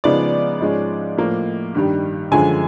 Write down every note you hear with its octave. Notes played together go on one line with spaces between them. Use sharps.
C#3 F3 G#3 B3 D#4 D5
G#2 F3 G#3 C#4
A2 F3 A#3
G2 D#3 G3
F#2 D3 F3 G#3 G#5